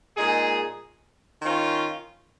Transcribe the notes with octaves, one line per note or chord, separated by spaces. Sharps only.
A#2 G#3 D#4 G#4
D#3 C#4 F4